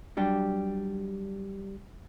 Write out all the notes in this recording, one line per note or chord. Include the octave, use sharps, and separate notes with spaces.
F#3 G3 D4 G4